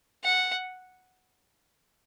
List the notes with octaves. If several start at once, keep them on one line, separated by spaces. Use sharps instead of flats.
F#5